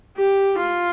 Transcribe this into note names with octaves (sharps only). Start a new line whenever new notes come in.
G4
F4